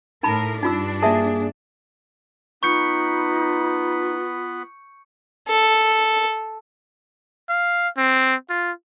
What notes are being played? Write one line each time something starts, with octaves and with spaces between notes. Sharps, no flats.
A2 D#4 A#4 A5 B5
G2 D4 D#4 F4 E6
A#3 G#4 E5 A5
B3 D#4 F4 B4 B5 C#6 G6 C#7
A4
F5
C4
F4